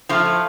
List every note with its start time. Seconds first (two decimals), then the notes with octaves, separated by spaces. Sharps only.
0.09 F3 A3 F4
0.26 A2